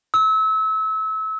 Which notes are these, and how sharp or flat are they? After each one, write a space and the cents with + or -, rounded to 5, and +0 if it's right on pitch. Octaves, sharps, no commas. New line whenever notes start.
E6 -30